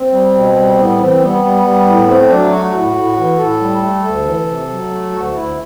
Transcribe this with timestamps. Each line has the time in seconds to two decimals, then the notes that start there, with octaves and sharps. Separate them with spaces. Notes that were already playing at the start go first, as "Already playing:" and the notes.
Already playing: C4
0.11 G3
0.33 B2
0.55 G3
0.77 A2 B3
0.98 E3 C4
1.20 G3 B3
1.42 G3
1.63 G3
1.86 A2
2.07 A3 C4
2.29 F#3 D4
2.51 A3 F#4
2.73 A2
2.95 A2
3.17 E3
3.38 A2 A4
3.60 G3
3.81 A3
4.04 D2
4.25 E3
4.47 C3
4.69 F#3
4.90 A3
5.12 D2 F#4
5.34 D2 E4